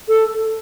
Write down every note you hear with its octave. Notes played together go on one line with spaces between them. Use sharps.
A4